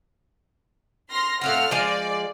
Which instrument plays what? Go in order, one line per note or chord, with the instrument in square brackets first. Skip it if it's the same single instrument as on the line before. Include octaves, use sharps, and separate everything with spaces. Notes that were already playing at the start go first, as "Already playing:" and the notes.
[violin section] C6 F6 A#6
[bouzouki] A2 C4 F4 [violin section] F#5 F6
[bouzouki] F3 G#3 [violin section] D5